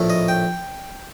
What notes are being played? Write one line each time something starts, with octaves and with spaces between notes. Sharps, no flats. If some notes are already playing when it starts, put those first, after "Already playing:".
Already playing: A#1 A2 A3
D#5
G5